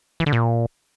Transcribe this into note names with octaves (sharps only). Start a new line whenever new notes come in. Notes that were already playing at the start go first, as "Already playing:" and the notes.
E3
D3
A#2